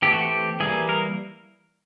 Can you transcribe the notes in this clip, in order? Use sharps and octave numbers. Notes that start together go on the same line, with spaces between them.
E3 A3 C4 G4
F#4
G4
E3 G3 A#3 G#4
A#4